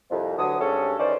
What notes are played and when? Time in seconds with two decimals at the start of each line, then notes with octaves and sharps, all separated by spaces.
0.11 C2 F2
0.38 D2 D3 E3 F#3 D#6
0.60 G2 C4 C#4 G#4 A4
0.99 D#3 E3 C#4 C5 D5